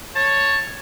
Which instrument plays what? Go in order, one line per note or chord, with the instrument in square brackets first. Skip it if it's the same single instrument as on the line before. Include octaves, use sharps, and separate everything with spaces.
[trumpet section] C#5 [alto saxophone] A5